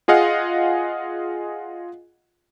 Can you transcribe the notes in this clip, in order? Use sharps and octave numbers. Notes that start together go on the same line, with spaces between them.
F4 G#4 D#5 F5 F#5